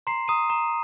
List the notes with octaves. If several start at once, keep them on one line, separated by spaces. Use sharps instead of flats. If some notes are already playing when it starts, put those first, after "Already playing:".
A#5 C6 C7
A#5 D#6 D#7
A#5